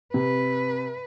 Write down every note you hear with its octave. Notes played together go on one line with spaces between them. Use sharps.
C3 B4